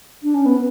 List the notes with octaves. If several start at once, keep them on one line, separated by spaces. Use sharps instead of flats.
D4
C#4
B3